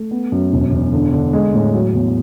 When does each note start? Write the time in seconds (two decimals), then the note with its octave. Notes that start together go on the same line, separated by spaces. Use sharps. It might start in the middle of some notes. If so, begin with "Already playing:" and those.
Already playing: A3
0.11 B3
0.32 F#2
0.52 E1
0.72 E2
0.92 D3
1.12 D3
1.33 G#3
1.54 A2
1.73 F#3
1.94 E2